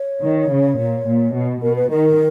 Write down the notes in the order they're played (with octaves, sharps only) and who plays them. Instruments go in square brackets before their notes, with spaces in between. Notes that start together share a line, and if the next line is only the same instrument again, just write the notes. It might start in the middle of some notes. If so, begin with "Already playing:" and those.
Already playing: [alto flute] C#5
[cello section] D#3
C#3
A#2
A#2
B2
[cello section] B2 [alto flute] A#4
[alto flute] B4
[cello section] D#3 [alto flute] A#4